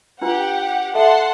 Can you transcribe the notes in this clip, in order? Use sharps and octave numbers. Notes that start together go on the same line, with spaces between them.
D4 F4 G4 B4 F#5
A4 E5 F#5 A5 C6